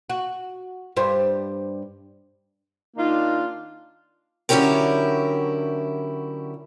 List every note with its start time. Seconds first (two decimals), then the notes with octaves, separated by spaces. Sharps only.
0.10 F#4
0.96 G2 G3 C5
2.97 D#3 A#3 D4 D#4 F4
4.49 D3 F#3 C#4 E4 G4 A#4